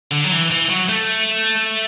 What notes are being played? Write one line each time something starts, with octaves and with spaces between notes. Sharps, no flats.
D3
F#3
E3
E3
F#3
A3